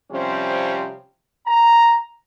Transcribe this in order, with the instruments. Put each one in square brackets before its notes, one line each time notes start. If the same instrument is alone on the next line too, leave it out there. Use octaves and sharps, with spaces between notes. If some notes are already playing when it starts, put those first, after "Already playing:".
[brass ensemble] C3 F3 G3 C4 C#4
A#5